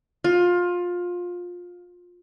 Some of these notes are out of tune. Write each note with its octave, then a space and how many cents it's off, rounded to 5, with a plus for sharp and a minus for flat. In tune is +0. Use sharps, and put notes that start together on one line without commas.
F4 +20